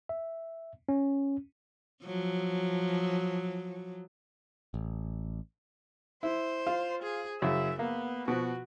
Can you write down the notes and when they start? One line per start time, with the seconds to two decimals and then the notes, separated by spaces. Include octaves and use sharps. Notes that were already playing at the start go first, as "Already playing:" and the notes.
0.09 E5
0.89 C#4
2.04 F3 F#3
4.74 A1
6.23 E4 C5
6.67 F4
7.03 G#4
7.42 F#2 C#3 E4 E5
7.79 A#3 B3
8.28 B2 F3 F#4